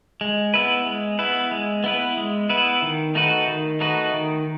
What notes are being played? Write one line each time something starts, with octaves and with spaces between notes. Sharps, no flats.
G#3
B3 E4 B4
G#3
B3 E4 B4
G#3
B3 E4 B4
G#3
B3 E4 B4
D#3
A3 D#4 F#4 B4
D#3
A3 D#4 F#4 B4
D#3